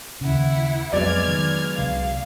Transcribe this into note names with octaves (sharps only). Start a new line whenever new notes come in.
D#2 C#3 E4 F#5
F2 F#3 G#3 B3 D5 F6 G#6
D#3
C2 D3 F5